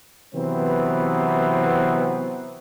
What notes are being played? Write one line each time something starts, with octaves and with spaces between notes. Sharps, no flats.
C3 E3 F#3 B3 C4